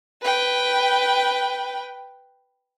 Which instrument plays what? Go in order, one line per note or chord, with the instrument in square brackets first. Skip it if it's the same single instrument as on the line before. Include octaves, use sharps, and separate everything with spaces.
[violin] B4 G5